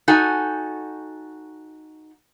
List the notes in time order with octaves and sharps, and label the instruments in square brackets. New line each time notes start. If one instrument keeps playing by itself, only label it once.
[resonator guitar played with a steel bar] D#4 F#4 A4 G#5